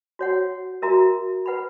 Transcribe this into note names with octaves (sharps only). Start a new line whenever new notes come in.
F#4 C#5 F#5
F#4 A#4 E5 A#5
B4 F#5 B5